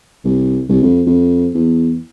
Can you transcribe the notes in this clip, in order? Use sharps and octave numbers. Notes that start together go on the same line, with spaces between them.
C2
C2
F2
F2
E2